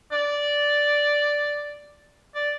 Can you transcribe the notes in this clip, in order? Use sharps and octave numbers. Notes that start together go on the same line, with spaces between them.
D5
D5